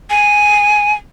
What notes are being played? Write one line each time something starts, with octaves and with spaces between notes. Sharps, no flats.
G#5